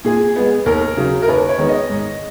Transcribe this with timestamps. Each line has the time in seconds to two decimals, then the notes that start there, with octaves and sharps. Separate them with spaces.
0.05 A#2 G#4
0.36 G#3 B3
0.66 D#2 A#4
0.97 C#3 F#3
1.22 A#4
1.28 D#2 B4
1.49 C#5
1.58 D#3 G#3 B3
1.69 D#5
1.90 G#2